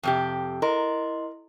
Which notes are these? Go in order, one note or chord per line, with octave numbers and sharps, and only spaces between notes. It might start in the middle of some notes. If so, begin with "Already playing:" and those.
F2 C3 G4
E4 A#4 D#5 C6